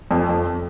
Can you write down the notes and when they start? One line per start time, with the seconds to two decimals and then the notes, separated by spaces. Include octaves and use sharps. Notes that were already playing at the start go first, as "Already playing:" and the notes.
0.11 F2
0.29 F2